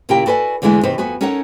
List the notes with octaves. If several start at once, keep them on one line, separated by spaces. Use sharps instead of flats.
A#2 C#3 E4 G4 A#4 G5
F#4 A4 B4 D5 G#5
E2 D3 G#3 A3 E4 G#5
E2 C3 D#4 B4 C5
F2 B3 F#4 B4 G#5
C#4 D#4 A4 A#4 C#5 F#5